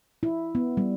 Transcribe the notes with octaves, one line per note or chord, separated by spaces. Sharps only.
E4
B3
G3